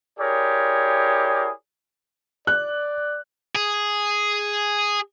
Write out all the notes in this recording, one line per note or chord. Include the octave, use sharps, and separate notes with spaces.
E4 G4 G#4 A#4 C#5 D5
D5 F#6
G#4